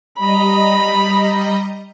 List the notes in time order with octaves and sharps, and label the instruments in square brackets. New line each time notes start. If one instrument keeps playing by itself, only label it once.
[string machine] G3 D#5 A#5 [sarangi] B5